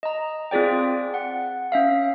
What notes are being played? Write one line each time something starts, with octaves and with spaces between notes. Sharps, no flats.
D#5 A#5
C4 F4 G#4 D5 G5
F#5
C#4 E5 F5